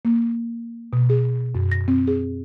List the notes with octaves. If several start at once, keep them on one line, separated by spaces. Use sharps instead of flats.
A#3
B2
G#4
F#2
A#6
C4
G#4